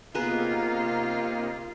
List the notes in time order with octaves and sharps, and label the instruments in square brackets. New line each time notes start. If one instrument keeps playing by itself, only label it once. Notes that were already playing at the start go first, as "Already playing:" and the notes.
[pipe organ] C3 A#3 D#4 [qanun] B3 G#4 B4 [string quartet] F4 [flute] A#5